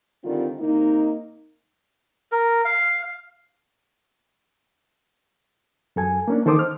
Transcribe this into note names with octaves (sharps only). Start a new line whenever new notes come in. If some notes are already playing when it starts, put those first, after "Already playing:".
D3 D#3 G3 C4 F4
C3 A#3 D#4
A#4
F5
F#2 A4 G#5
A#3 C#4 D4
D#3 A4 C5 D6 D#6
F6